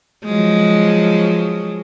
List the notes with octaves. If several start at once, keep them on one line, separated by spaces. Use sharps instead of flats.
F3 F#3 G#3